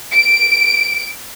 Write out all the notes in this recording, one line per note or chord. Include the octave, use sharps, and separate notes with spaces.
D7